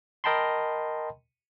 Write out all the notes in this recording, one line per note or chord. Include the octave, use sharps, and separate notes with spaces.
A#4 D#5 G5 A5 B5 C6